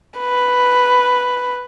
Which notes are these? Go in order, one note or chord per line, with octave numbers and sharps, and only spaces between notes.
B4